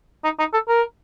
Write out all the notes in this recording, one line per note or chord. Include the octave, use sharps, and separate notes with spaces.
D#4
D#4
A4
A#4